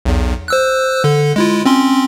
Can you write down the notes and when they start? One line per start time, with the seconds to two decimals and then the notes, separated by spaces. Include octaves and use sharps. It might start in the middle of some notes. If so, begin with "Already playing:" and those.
0.05 B1 E2
0.48 C5 E6 F#6
1.04 D3 A4
1.36 G#3 E4 F4
1.65 C4 C#4 C6